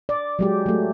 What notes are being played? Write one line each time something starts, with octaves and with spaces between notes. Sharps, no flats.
D5
F#3 G#3 G4
F#3 A3